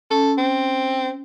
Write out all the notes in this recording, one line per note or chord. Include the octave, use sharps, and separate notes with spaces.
C#4 A4
C4